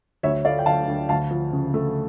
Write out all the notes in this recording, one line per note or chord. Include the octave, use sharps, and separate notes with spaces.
D2 C#5 E5
A3 D5 F5
G5
D3 F5 A5
D2
D2 F5 A5
F3
C#3
A3